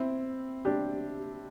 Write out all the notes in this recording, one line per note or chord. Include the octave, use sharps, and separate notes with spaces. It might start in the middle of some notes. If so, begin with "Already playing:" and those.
Already playing: C4 E4
D4 G4